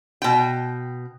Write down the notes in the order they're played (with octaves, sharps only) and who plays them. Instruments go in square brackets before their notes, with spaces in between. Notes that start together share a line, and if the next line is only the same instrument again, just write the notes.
[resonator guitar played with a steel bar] B2 G5